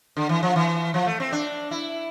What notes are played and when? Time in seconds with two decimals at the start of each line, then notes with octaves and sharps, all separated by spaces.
0.17 D3
0.29 E3
0.43 F3
0.56 E3
0.94 F3
1.06 A3
1.20 C4
1.32 D4
1.71 E4